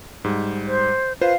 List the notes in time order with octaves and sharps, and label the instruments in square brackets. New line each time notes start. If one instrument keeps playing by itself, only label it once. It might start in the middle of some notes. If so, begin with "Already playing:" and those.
[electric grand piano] G#2 G3
[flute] C5
[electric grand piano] F4 B4 C5 [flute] F5